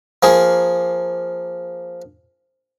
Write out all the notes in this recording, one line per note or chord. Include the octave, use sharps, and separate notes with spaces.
F3 A#3 G#4